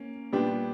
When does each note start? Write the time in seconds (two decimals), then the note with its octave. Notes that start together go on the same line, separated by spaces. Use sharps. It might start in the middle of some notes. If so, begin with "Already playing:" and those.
Already playing: A#3 C#4
0.33 A#2 G3 B3 D4 G4